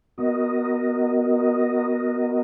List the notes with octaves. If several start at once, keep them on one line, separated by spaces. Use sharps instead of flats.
B3 F#4 A#4 D#5